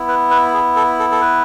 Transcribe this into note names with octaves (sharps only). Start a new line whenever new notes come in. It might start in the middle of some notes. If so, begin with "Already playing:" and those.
Already playing: B3 E4
B4
B4
G#4
A4
A4
A4
B4